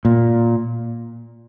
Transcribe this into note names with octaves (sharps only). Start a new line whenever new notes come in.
A#2